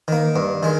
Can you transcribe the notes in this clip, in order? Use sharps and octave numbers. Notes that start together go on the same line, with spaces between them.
D#3 A#3
G2
D#3 G#3